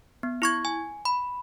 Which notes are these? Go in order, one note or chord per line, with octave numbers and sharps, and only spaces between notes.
B3
E4 C#6 G#6
G#5
B5